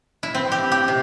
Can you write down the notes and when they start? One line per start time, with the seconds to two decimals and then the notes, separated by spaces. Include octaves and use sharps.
0.23 E4
0.35 C4
0.52 G4
0.72 G4
0.88 C3